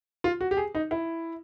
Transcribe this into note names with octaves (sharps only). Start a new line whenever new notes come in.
F4
F#4
G4
G#4
D#4
E4